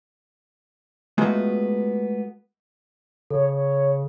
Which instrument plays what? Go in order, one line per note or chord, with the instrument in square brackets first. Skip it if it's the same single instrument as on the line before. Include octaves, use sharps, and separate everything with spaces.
[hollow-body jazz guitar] G#3 A3 B3 F4 F#4
[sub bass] C#3 [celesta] A4 [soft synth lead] C#5
[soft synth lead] C#5